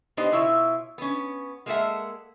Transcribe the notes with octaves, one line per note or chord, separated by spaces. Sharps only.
B3 D4 D#4 G4 C5 D#5
B2 E4 F4 C#5 E5
B3 C#4
G#3 A#3 B3 A4 E5 F#5